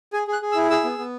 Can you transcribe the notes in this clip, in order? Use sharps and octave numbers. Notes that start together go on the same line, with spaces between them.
G#4 G#5
G#4
F#6
G#4
E6
E4
G#4 E6
B3
B3